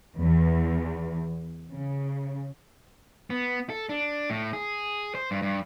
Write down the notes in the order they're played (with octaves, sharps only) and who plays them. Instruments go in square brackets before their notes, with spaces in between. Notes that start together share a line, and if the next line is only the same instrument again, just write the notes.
[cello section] E2
C#3
[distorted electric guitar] B3
A4
D4
A2
G#4
C5
G2
G2